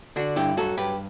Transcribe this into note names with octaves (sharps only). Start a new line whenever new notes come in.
D3 D4 F#4
G2 E4 G4
F#3 F#4 A4
G2 G4 B4